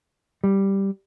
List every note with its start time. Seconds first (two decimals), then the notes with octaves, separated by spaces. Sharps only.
0.44 G3